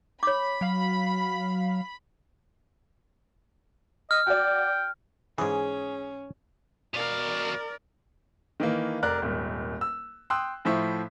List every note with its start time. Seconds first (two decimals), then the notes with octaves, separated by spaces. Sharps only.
0.23 C#5 B5 D6
0.61 F#3 F5
4.11 D#5 F6
4.27 F#4 D5 G5
5.38 G#2 E3 C#4 G#4
6.94 B2 A#4 D5 F5
8.60 D#3 E3 A#3
9.02 F1 A#4 D5 F#6
9.22 D#1 G#1
9.81 E6
10.30 G5 C6 D#6 E6 F#6
10.65 A2 F3 E4 E5 C#6